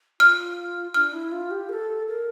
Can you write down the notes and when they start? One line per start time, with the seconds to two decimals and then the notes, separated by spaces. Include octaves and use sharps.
0.20 F4 F6
0.94 D4 F6
1.13 E4
1.32 F4
1.51 G4
1.69 A#4
1.73 A4
2.07 A#4